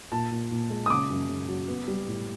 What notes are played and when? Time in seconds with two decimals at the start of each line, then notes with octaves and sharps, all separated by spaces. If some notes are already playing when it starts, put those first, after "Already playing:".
0.12 A#2 A5
0.31 A#2
0.51 A#2
0.70 G#3
0.86 D#6
0.90 C#3 D6
1.10 F#2
1.29 C#3
1.48 F#3
1.68 B3
1.88 G3
2.08 A2